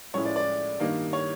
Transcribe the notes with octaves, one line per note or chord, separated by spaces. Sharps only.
A2 F3 G#3 C#4 E4 C#5
D5
D5
G2 D#3 G3 A#3 D#4
C#5